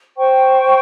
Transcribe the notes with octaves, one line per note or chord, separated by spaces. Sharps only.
C5 G5 C#6